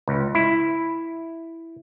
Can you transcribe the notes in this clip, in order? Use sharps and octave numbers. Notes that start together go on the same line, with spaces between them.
C#2
E4